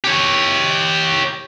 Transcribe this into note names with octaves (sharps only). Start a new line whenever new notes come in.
G4 C#5